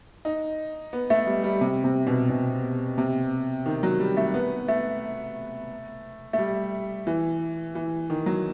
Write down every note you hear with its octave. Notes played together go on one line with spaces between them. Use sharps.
D#4
B3
A3
G3
G3
C3
C3
B2
B2
C3
D#3
F#3
G3
A3
B3
A3
A3
G3
E3
E3
D#3
F#3